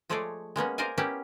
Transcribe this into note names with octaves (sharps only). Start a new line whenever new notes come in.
F3 G#3 A3 G#4 C#5 D5
G#3 A#3 B3 C#4
A#4 C5 D5 D#5 F5 G#5
A#3 B3 C#4 E4 G4